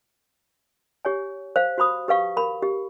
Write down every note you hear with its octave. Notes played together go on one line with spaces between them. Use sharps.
G4 C#5 G#5
C5 F5
F#4 C5 B5 D#6
G4 B4 F5 C#6
A#4 B5
G4